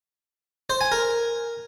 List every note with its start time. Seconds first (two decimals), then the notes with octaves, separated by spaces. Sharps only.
0.70 C5
0.81 G#5
0.92 A#4